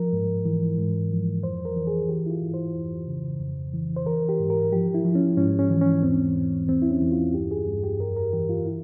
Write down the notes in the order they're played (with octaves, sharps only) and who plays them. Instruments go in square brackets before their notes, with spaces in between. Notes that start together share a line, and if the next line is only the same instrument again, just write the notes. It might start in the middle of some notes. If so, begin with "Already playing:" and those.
Already playing: [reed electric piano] F3 A#4
G#2
E3
G#2
F3
F2 C5
A#4
E3
G#4
E3 G4
E4
F4
G#2
C5
F2
C#3
F2
E3
C5
E3 A#4
G4
G#2
A#4
F3 G4
E4
F3
C#4
G#2 C#4
C#4
E3
C#4
E2 C4
E2
E2 C4
E4
C#4
E2
F4
G2 G4
G#4
G2
G4
F2 A#4
A#4
E3 G4
F4
E4